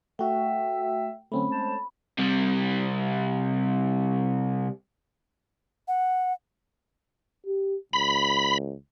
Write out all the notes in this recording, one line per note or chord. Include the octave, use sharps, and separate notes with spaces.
A3 F#4 E5 G5
D3 F#3 A3 C4 C#4 B5
G#3 C5 A5
C3 G3
F#5
G4
C#2 B5